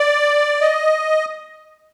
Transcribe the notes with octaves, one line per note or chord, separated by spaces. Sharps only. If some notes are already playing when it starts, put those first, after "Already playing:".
Already playing: D5
D#5